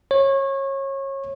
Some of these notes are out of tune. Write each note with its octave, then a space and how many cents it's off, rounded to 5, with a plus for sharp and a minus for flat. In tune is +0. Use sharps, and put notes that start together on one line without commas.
C#5 -25